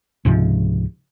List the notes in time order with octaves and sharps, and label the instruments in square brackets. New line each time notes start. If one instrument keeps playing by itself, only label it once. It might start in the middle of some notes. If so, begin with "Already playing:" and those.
[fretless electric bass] C#2 G#2 C3 F3